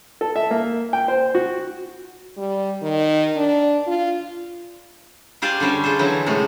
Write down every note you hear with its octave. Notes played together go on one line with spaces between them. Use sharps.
A4
E5
A#3
G5
C5
F#4
G3
D#3
D4
F4
F4 G4 C5 D5 F5 G#5
D3 G3 C#4 C5 D5
F4 G#4 A4 C5
D3 E3 F#3 C#4 E4
A2 C3 F#3 G#3 A3